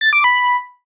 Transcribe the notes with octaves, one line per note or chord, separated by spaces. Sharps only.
A6
D6
B5